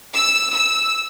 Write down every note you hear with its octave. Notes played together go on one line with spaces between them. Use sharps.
E6
E6